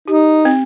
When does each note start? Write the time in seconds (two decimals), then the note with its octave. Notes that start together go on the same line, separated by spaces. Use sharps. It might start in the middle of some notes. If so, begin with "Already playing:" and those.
0.08 D#4 G4
0.45 C4